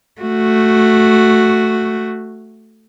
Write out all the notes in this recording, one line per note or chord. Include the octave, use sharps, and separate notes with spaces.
A3 F#4